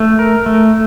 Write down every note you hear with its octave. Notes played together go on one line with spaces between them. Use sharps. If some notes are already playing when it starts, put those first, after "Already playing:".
Already playing: A3
A#4
A3